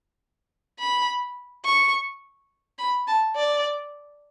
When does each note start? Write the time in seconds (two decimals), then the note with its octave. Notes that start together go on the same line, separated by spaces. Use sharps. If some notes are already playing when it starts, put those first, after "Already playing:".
0.79 B5
1.65 C#6
2.78 B5
3.07 A5
3.36 D5